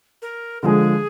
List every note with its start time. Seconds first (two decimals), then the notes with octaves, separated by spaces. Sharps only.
0.22 A#4
0.62 D3 F3 G#3 G#4 A#4